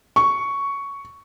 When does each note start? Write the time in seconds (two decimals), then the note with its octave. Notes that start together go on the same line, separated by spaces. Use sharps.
0.16 C#6